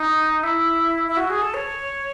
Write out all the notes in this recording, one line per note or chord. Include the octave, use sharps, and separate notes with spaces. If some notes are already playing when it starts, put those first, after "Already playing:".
Already playing: D#4
E4
E4
F#4
G#4
A4
C#5